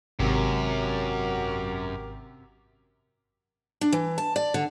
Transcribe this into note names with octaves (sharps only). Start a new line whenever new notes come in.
G#1 F#2 C3 F#4 G4 A#4
D4
E3
A5
D5
D3